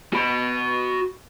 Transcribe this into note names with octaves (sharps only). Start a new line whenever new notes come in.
F#4 B5